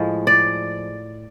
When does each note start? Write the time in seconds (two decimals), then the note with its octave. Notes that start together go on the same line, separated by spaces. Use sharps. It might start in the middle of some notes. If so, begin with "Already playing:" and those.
Already playing: A2 F3 G#3
0.27 D5